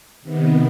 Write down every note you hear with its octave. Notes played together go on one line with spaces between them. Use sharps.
C3 D#3 B3